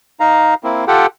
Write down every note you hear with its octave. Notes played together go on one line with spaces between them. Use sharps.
D#4 F5 A#5
A#3 C4 E4
F4 G4 A4 F#5 G5